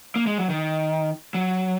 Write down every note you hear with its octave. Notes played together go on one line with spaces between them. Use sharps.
A#3
G#3
F#3
D#3
F#3